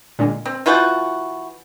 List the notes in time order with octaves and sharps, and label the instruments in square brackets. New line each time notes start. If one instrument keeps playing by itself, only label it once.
[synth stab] A#2 D3 G#3
[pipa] C4
[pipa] E3 F4 F#4 [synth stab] G#5 G6 A6